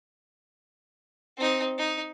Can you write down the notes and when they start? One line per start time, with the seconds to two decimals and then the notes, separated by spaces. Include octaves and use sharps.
1.37 C4 D#4
1.78 D#4